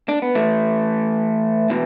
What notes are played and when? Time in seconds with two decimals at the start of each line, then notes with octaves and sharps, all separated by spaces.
0.09 D4
0.22 B3
0.35 E3 A3
1.70 B2 E3